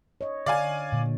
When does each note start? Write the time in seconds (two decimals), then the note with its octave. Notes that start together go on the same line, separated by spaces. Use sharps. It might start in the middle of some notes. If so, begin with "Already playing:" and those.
0.21 C#5 D#5
0.46 D3 D5 F5 G#5
0.92 A#2 D3